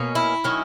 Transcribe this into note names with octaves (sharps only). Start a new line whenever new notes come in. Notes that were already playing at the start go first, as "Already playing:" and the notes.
Already playing: B2 A#3 C#4
E4
D#3 F#3 C#4